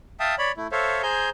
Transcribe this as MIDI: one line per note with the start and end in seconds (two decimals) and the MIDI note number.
0.20 0.35 76
0.20 0.35 77
0.20 0.35 79
0.20 0.35 81
0.20 0.35 87
0.38 0.52 73
0.38 0.52 74
0.38 0.52 83
0.57 0.67 57
0.57 0.67 64
0.72 1.02 69
0.72 1.02 72
0.72 1.02 73
0.72 1.02 76
0.72 1.02 77
1.03 1.30 68
1.03 1.30 72
1.03 1.30 80
1.03 1.30 82
1.03 1.30 91